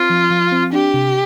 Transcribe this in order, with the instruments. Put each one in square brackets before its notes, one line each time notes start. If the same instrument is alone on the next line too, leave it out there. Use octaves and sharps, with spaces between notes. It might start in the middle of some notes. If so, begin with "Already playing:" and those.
Already playing: [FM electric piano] C4 [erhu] F4
[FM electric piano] F3
F3
C4
[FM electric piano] D4 [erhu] G4
[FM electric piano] C3